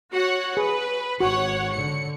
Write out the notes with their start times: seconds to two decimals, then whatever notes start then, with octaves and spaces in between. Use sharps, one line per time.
0.12 F#4 C#5 F#5
0.57 G#4 B4
1.20 G#1 F#4 C#5 F#5
1.72 D3 C#7